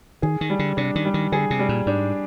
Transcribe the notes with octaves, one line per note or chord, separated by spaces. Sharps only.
D#3 G#4
D#3
G3
D3
C3 D4
D#3
G3
D#3
D3 G#4
C3
G3
A#2
G#2 D4